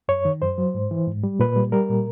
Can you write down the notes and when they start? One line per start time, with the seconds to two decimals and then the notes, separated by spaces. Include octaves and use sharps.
0.08 F#2 C#5
0.25 D#3
0.41 F#2 C5
0.58 F#3
0.74 G#2
0.91 E3
1.07 G#2
1.23 G3
1.39 A#2 B4
1.56 G3
1.72 G3 A#4
1.89 A#2